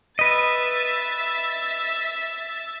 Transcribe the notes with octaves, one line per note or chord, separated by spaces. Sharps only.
B4 D#5 E5 A6